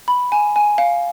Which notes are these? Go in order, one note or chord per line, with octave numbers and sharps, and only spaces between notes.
B5
G#5
G#5
F5